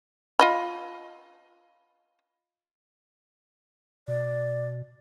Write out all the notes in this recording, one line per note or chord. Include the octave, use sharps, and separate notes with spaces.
F4 D#5 B5
B2 D5